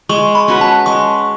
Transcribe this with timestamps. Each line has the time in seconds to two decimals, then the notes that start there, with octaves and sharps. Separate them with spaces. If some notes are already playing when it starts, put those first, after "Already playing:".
0.09 G#3 C#6
0.35 B5
0.48 C#4 F#4 B4
0.61 A5
0.86 G#3 C#6